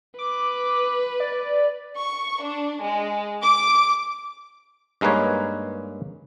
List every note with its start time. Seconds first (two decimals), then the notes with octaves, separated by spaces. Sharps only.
0.19 B4 D6
1.20 D5
1.98 C#6
2.43 D4
2.83 G#3
3.43 D6
5.01 G2 G#3 A#3 D#4 B4 C#5